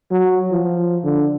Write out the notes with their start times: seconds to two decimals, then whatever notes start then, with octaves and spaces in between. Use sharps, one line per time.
0.11 F#3
0.51 F3
1.04 D3